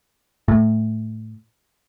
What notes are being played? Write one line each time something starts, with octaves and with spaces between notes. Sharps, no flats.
A2